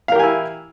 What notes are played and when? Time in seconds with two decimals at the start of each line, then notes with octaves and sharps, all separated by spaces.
0.08 F5
0.12 A#4
0.16 G4
0.19 G#5
0.23 E4